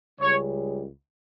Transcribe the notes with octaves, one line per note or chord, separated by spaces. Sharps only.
C#2 C#3 G3 C#5